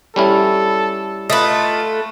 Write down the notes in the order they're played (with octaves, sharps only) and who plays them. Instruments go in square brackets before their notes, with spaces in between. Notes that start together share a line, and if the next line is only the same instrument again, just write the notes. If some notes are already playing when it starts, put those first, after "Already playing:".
[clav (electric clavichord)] G3 C#4 E4 [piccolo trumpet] A4
[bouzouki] A3 B4 [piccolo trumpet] F4 [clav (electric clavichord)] D#5